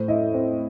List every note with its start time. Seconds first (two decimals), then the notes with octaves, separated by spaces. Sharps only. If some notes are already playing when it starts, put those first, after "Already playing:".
Already playing: A2 C5
0.08 E4 D#5
0.34 C4 C5